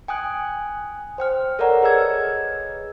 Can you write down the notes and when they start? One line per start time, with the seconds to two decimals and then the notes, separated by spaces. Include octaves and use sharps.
0.08 G5 G#5 D#6 F#6
1.18 C5 G5 F6
1.59 A4 A#4 C#5 D5 F#5 A#5
1.82 G#4 B4 C#5 D#5 E6 G#6